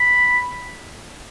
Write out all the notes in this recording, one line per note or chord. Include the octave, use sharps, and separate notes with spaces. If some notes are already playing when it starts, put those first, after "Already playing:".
Already playing: B5